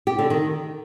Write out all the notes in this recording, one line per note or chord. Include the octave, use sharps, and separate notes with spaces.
G4
D3
D#3